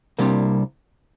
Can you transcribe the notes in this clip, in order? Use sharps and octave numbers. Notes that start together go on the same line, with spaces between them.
C2 C3 G3 A#3 D4